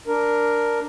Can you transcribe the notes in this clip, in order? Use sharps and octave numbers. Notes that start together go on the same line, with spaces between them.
D4 A#4